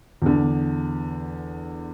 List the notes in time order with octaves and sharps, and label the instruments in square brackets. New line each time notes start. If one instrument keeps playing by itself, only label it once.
[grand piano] E2 D3